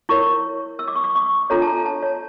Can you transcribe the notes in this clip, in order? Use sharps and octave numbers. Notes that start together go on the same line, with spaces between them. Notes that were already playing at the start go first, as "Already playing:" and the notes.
E4 A#4 C#5 C#6
E6
D6
C#6
D6
C#6
D4 F4 A4 C#5 A#5
A5
A#5
A5
C#5